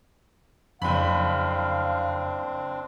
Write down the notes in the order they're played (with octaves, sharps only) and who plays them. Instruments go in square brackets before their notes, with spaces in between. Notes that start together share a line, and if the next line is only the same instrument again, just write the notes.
[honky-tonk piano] F#1 B5 [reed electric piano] F2 [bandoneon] C4 D4 [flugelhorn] F5